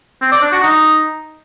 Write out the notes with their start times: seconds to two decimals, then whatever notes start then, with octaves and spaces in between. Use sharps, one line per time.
0.21 C4
0.32 D5
0.42 D4
0.52 F#4
0.62 D#4